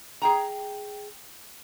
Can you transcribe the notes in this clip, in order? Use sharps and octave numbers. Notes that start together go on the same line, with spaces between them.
G#4 G5 A#5